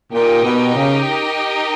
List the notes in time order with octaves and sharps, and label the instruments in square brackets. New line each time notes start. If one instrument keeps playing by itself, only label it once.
[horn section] A#2 [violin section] D#4 G4 A#4 D#5 G5
[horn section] B2
C#3